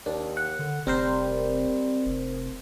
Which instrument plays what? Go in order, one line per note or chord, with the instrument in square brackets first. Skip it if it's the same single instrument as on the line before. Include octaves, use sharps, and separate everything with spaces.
[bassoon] D#2 [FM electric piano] D4
[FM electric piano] F#5
[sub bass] D3
[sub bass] F1 [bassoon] G3 [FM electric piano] C4 A#4 C5
[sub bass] F1